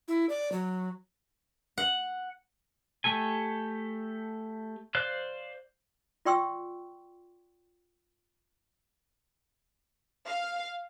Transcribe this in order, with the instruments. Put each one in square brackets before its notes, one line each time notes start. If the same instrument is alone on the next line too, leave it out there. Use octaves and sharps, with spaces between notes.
[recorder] E4
D5
F#3
[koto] F#5
[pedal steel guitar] A3 G4 A4 G#5
C5 D5 F5 F#6
[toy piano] F4 D5 G5 C6 C#6 E6
[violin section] F5